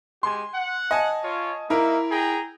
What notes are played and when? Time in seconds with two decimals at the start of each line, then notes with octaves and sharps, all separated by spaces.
0.23 G#3 G4 G#5 C6
0.54 F#5
0.91 D#5 G#5 A5
1.23 F4 C#5
1.70 A#3 D#4 E4 A#4 E5
2.10 G#4 G5 A#5